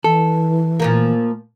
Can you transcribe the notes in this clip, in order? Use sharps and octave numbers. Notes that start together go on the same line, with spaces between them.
E3 A4
A#2 F3 A#3